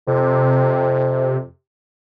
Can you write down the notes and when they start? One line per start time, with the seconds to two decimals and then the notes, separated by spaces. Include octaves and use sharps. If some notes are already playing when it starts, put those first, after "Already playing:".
0.07 F2 C3